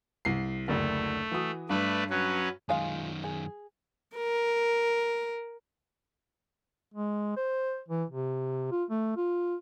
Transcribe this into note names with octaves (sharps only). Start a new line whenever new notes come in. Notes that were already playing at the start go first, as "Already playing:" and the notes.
C2 C7
F#1 D2 A3 D4
E3 F#4 D#6
G2 A3 B4 D5
F#3 C#4 B4
F#2 D#3 G#3 F4 F5
G#4
A#4
G#3
C5
E3
C3
F4
A3
F4